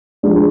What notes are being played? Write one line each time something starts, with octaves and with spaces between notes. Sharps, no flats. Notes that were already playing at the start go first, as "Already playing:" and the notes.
F3 G#3 D4